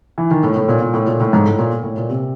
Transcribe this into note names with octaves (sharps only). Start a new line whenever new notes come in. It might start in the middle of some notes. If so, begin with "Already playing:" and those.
E3
D#3
A2
A2
A#2
A#2
A2
A#2
A2
G#2
A2
A#2
A2
A#2
C3